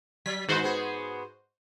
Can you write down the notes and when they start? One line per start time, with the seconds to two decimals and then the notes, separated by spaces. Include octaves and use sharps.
0.26 F#3 B6
0.48 G#2 D#3 G#3 F#4 B4 C5
0.63 B3 G#4